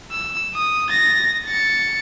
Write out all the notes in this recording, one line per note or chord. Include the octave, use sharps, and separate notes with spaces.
E6
D#6
A6 A#6
A6 C#7